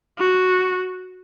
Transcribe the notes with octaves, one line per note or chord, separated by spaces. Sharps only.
F#4